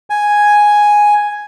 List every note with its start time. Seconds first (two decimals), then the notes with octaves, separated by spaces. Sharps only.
0.10 G#5